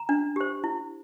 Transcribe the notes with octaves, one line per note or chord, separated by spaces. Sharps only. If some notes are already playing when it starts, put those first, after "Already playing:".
Already playing: A#5
D4
G4 C5
E4